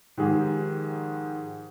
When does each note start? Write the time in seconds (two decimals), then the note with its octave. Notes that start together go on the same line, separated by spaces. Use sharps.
0.18 G#2 D#3 F3 G4 G#4